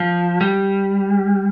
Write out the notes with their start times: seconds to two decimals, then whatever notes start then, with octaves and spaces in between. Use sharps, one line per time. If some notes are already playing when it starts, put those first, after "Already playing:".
Already playing: F3
0.41 G3